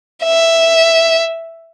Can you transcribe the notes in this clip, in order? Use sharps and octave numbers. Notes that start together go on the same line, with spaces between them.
E5